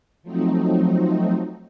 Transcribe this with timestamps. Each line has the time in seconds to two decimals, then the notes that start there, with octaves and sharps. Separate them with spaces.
0.23 F3 F#3 A3 C4 D#4